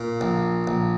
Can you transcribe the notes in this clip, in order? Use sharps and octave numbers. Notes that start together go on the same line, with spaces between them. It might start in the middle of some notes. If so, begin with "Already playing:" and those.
Already playing: A#2
A#1
A#1